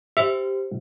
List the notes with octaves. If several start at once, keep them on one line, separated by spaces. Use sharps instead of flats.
G4 C5 E5